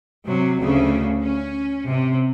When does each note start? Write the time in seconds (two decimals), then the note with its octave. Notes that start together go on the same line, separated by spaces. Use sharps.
0.25 C3 F#3
0.60 D2 C#3 A3
1.22 C#4
1.86 C3